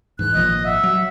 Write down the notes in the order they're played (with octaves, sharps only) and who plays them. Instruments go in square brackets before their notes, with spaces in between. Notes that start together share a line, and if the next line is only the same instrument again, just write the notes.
[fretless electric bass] G#2 E3 [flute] F#6
[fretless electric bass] G#1 A#2 F3 [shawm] D#5
[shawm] E5 [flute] F#5
[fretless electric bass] F#3